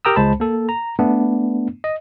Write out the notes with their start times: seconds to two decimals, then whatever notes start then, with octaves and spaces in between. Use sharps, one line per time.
0.05 G4 A#4 G5 A#5 D#6 E6
0.16 C#2 G#3 C5 A5 B5
0.40 A#3 A4
0.69 A#5
0.99 A3 B3 D4
1.84 D#5